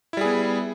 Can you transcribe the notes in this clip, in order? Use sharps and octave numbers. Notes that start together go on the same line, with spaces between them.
G3 B3 E4 G#4